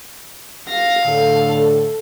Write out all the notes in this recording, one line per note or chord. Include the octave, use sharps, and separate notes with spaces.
F5 A#6
A2 D3 A4